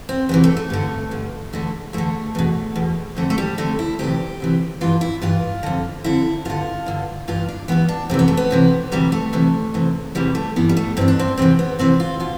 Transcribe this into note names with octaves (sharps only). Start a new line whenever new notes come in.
C4
E2 C3 E3 B3
A3
A3
G2 D3
G2 D3
E2 D3 A3
E2 D3 A3
E2 B2
E2 B2
F2 D3 A3
A3
G3
F2 D3 A3
E4
D2 C3 E3 G4
D2 C3 E3
G2 E3 F4
E4
G2 E3 F4
F2 D3
F2 D3 E4
G2 D3 F4
G2 D3
G2 E3 F4
D4
G2 E3 B3
D4
F2 C3 E3 C4
B3
A3
B3
F2 C3 E3
D2 C3 E3 G3
A3
D2 C3 E3
E2 C3 E3
E2 C3 E3 G3
A3
G2 E3 B3
G3
A3
G2 E3 C4
D4
C4
E2 C3 E3 C4
B3
E2 C3 E3 C4
F4
B2 F4